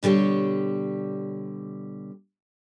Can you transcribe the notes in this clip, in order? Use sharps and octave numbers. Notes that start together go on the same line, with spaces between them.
B2 D3 G3 G4 C#5